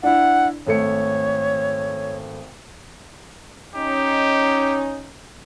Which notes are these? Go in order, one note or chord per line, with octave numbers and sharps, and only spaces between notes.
D4 E4 F#5
G#1 A3 C#5 C#7
C#4 D#4 G4